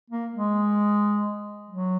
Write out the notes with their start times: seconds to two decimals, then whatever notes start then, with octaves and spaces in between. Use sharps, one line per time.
0.10 A#3
0.33 G#3
1.70 F#3